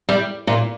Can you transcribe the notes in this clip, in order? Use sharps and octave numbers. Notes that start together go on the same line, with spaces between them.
G3
A#2